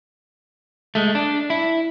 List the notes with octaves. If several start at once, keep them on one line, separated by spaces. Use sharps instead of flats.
G#3 A3
D4
E4